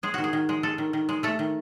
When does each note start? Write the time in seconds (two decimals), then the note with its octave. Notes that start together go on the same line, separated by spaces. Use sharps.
0.03 G#3 G#4
0.14 D#3 F#4
0.24 G#4
0.33 D#3
0.49 G#3
0.63 G#3 A4
0.78 D#3
0.93 D#3
1.09 G#3
1.23 A3 A4
1.39 D#3